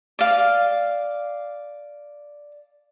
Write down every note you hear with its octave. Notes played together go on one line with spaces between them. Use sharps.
D5 F5